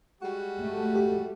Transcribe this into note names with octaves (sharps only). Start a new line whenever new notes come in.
G3 G#3 F#4
A3
G4